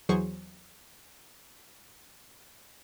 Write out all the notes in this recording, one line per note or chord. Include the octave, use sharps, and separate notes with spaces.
E2 F#3 G#4 C5 C#6